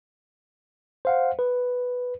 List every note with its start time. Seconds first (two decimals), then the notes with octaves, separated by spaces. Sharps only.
1.05 C5 F5 F#5
1.39 B4